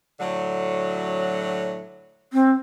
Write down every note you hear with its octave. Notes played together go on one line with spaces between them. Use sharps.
A2 D3 F#3
C4